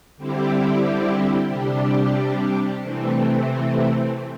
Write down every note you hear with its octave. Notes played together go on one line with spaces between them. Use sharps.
D3 G3 C4 E4 G4
C3 G3 D4 G4
C3 E3 A3 C4